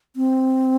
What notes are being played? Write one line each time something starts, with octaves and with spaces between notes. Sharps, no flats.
C4